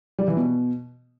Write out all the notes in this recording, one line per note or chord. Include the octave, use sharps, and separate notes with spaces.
G3
E3
B2